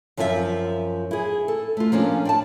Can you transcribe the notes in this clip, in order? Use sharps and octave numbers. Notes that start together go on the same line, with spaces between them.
F#2 F3 C4 F4 G4 E5
E4 G#4
A4
A3 F4
F3 A#3 C#4 D4
D5 G5 A5